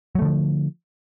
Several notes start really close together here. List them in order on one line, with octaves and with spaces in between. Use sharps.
F#3 A3 D3 F3